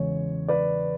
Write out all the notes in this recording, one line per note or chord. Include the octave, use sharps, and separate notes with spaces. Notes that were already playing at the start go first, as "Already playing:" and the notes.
Already playing: E2 C#3 G#3 C#4 C#5
B4 D5